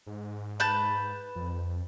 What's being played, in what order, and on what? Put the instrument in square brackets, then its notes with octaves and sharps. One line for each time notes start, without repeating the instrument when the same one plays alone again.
[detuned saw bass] G#2
[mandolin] B4 A5 G6
[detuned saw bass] F2